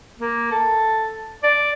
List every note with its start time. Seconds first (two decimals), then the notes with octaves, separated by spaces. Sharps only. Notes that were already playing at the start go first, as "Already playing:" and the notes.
0.19 A#3
0.51 A4
1.43 D5